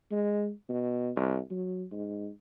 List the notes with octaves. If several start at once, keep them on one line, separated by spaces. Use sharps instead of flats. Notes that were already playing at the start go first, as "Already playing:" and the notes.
G#3
B2
C2
F#3
G#2